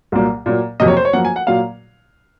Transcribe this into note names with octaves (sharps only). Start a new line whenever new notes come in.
C2 A#2 F#3 A#3
A#2 F#3 A#3
F2 C3 F#3 A#3 D#5
C#5
C5
C#5
F#2 F3 A#3 F#5
G#5
F#5
A#2 F#3 A#3 F5